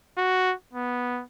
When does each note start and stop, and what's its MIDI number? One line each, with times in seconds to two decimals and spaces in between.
0.18 0.53 66
0.73 1.22 59